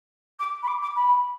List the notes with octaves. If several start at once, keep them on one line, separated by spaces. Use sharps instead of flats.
D6
B5
D6
D6
B5